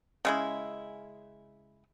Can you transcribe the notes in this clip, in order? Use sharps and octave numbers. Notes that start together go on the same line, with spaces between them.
C#3 G#3 E4